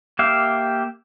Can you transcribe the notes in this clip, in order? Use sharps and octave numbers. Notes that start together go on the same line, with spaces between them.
A#3 G4 E5 F5